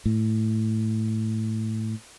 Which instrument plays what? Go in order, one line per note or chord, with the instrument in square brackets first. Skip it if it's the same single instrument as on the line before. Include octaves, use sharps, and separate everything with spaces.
[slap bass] A2